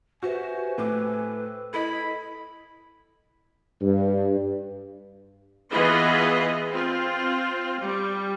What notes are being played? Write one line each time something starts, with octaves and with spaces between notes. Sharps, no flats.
F#4 G4 B4 C5 E5 G#5
A2 B4 C5 G5 D6 E6
E4 A4 D#5 B5
G2
E3 B3 F4 G#4 B4 D#5
C4 F4
G3